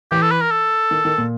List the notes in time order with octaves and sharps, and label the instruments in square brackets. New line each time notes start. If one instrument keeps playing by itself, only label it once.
[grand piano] E3 [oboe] G4
[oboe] A4
B4
A#4
A4
[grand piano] D#3
D#3
A#2